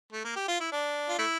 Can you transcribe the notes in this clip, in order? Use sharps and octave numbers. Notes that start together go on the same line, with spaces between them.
A3
A#3
G4
F4
E4
D4
F4
A3 E4